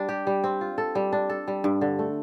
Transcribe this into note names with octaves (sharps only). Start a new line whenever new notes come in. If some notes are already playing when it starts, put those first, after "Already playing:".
Already playing: G3 D4
G4
G3
C4
F4
A4
G3
D4
A4
G3
G2
D3
A3